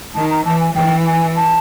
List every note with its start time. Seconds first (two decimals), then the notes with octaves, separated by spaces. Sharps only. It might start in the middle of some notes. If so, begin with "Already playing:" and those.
0.15 D#3 A5
0.30 A#5
0.45 E3 A5
0.60 G#5
0.75 E3 G5
1.06 G#5
1.36 A5